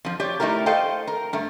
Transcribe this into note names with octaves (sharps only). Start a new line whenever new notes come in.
F2 F3
G4 C#5 D5
A3 D#4 E4 G4 A#4
A4 C5 D#5 F5 G5
A#4
G2 A3